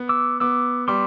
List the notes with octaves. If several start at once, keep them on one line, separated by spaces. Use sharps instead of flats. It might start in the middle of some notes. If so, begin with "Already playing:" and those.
Already playing: B3
D6 E6
B3 D6 E6
G3 C6 D6